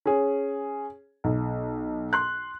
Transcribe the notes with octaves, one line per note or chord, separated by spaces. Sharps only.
C#4 G#4
B1
C6 F#6